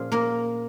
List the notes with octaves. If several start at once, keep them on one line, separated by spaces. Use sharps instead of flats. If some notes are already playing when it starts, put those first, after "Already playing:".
Already playing: A#2 F3 C#4 F4 G#4
A#3 A#4